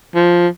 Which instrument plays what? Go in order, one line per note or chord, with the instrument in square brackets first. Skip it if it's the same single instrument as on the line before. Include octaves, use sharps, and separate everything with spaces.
[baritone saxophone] F3